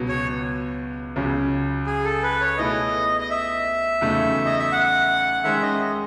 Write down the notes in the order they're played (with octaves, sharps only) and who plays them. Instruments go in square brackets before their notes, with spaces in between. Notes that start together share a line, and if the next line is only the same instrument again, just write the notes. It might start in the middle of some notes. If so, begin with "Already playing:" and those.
Already playing: [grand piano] C#2 B2 F#3
[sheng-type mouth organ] C#5
[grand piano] C#2 C#3 F#3 C#4
[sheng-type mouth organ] G#4
A4
B4
C#5
[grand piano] B2 A3 E4 G#4 B4 [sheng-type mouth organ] D#5
[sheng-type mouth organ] D#5
E5
[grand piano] E2 C#3 F#3 A3 D#4
[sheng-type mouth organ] D#5
E5
F#5
[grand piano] D#3 G#3 C#4 [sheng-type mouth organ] E5
[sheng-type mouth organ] D#5